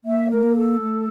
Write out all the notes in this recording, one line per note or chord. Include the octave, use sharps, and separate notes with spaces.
A#3 E5
A3 A#4
A#3
A4
A3